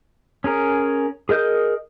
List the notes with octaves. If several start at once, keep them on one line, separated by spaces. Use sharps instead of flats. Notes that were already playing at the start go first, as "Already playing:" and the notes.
C#4 G#4 A#4
G#4 A#4 D#5 G6